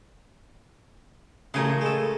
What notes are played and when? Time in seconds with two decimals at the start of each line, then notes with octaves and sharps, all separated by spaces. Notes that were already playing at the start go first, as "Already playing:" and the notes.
1.54 A1 C#3 A3 A#4 G#5 C6
1.81 G#3 A4